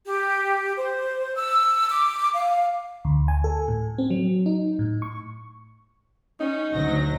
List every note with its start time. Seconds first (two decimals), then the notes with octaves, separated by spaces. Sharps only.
0.05 G4
0.76 C5
1.35 E6
1.88 D6
2.33 F5
3.05 D2
3.28 G#5
3.44 A4
3.68 A2
3.98 C4
4.10 F#3
4.46 D#4
4.79 A2
5.02 C#6
6.40 C#4 D#4
6.72 D2 F#3 A#6